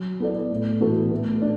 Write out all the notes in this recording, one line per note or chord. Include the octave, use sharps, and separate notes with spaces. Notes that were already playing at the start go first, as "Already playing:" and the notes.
Already playing: F#3
B3 E4 A4 D5
A2
E3 B3 F#4 A4
A3
D4